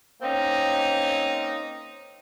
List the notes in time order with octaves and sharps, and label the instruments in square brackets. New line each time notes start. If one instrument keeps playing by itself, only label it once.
[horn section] A#3 C4 C#4 D#4